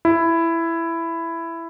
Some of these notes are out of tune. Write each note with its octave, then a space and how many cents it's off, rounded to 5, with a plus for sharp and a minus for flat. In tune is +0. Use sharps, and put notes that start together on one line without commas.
E4 +10